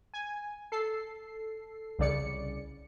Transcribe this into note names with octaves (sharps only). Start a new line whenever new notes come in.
G#5
A4 C7
C2 C#3 D5 C#7